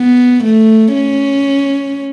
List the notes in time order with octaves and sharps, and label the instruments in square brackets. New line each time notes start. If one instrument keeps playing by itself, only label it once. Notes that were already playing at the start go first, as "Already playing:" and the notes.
Already playing: [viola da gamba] B3
A3
C#4